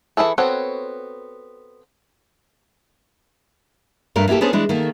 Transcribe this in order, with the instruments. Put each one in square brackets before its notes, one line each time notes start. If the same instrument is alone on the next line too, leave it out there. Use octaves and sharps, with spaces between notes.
[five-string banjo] E3 D4 E4 G#4 A4
B3 C4 F#4 A4 C#5
[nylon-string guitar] G2 A3 A#4
A#3 E4 F4 G4 A4
B3 C#4 D4 G#4 A4 C5
E3 G#3 D4 E4
D#3 A3 A#3